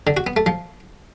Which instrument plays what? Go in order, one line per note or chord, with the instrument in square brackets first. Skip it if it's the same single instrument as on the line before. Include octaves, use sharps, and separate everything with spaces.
[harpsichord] D3
F#4
B3
A3
F3